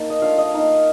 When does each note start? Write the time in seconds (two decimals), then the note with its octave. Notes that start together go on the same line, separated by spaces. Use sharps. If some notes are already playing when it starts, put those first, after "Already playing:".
Already playing: A#3 D#4 A5
0.10 D#5
0.22 A3 D4 F4 F5
0.38 D#5
0.54 A#3 D#4